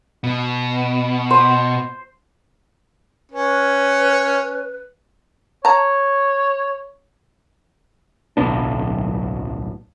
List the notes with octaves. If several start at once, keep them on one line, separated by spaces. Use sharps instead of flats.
B2
C5
C#4 B4
C#5 A5 A#5
D1 B1 B3 D4